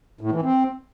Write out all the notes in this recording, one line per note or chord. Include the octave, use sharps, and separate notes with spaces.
A2
E3
C4